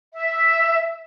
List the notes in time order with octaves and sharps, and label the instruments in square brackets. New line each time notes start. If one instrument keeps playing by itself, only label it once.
[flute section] E5